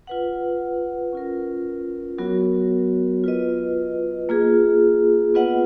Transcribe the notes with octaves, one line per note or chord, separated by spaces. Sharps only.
F4 B4 F#5
C#4 F4 A#4
F#3 B3 F#4 A#4 C#5
F4 B4 D#5
A#3 F4 G#4
B3 F4 B4 D#5 F#5